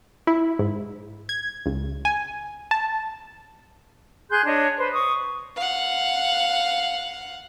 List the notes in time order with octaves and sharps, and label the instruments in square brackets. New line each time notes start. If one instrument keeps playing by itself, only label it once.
[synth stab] E4
G#2
G#6
C#2
G#5
A5
[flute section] G#4 C6 F#6 G6
D4 C#5 D#5
B4 C5
C#6 D#6
[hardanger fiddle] F5 F#5